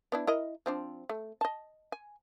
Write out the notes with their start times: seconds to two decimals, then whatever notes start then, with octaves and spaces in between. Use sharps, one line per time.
0.12 B3 D4 E4
0.27 E4 A#4 D#5
0.66 F3 C4 D4
1.09 A3
1.41 D#5 A5
1.92 G#5